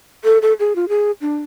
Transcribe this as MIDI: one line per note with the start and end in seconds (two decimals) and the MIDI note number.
0.24 0.38 69
0.42 0.53 69
0.60 0.73 68
0.75 0.88 65
0.89 1.11 68
1.21 1.37 62